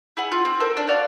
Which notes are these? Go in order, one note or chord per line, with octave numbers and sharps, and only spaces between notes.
E4 G#4 F#5
F4
C4
A4 A#4 C5
D4
F#4 D5 F5